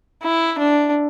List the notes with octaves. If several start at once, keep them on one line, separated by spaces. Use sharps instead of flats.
E4
D4